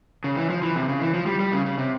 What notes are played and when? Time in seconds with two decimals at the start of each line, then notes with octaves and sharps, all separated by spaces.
0.24 C#3
0.37 E3
0.50 F3
0.62 E3
0.76 C3
0.88 C#3
1.02 E3
1.14 F3
1.26 G3
1.40 G3
1.53 C#3
1.65 C#3
1.78 C3